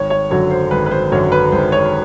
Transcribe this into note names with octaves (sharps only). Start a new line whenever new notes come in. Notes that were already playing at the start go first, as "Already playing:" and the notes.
Already playing: G#1 C#5
C#5
F#2 D3 F#3 C#5
C5
G#1 B4
B4
C5
F#2 D3 F#3 C#5
B4
G#1 C5
C#5